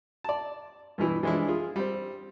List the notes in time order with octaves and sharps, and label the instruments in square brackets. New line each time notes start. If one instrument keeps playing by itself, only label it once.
[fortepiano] D5 A5
G2 B2 E3 E4
E3 F3 G#3 D4 E4
F4 G#4
G3 C4